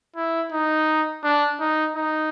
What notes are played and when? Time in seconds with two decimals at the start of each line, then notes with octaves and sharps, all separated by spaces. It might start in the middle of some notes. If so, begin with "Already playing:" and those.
0.16 E4
0.52 D#4
1.24 D4
1.60 D#4
1.96 D#4